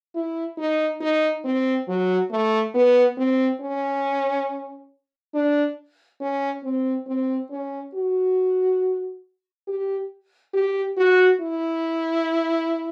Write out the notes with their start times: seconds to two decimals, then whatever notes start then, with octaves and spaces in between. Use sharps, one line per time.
0.15 E4
0.58 D#4
1.01 D#4
1.45 C4
1.88 F#3
2.31 A3
2.74 B3
3.18 C4
3.61 C#4
5.34 D4
6.21 C#4
6.64 C4
7.07 C4
7.51 C#4
7.94 F#4
9.68 G4
10.54 G4
10.97 F#4
11.41 E4